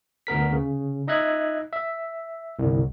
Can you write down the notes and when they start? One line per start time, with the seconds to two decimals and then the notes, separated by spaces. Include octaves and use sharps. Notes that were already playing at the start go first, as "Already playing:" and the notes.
0.27 D2 B3 A#4 B6
0.53 C#3
1.08 D#4 D#5 E5 F#6 G#6
1.73 E5
2.59 G1 C2